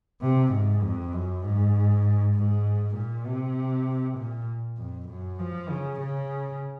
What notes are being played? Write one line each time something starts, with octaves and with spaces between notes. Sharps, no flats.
C3
G#2
F2
F#2
G#2
G#2
A#2
C3
A#2
F2
F#2
F3
C#3
C#3